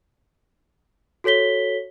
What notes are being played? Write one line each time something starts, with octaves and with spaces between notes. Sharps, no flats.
F#4 A4 C#5 B6 G7